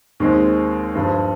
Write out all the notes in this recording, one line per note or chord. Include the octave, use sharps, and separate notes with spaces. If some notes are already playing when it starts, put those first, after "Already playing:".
D#2 D#3 G#3 C4
G2 D3 F3